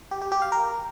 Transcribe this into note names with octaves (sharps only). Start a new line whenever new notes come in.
G4
G4
G4
F5
A#4